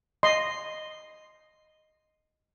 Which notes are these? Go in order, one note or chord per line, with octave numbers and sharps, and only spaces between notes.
D#5 C6